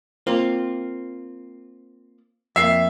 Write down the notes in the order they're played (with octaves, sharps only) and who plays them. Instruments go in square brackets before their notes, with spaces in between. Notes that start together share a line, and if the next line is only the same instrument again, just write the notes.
[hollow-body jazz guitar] A#3 C4 F4
[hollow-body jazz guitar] F2 A#3 [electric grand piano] E5 C7